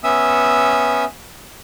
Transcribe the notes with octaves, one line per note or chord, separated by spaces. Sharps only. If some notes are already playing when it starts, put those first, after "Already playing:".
B3 C#4 E5 D#6 E6